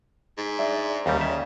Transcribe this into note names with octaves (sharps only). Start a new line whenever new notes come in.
G#2
D4 D5 E5
D#2 C#3 G3 D5 A#5
G#4 D5 E5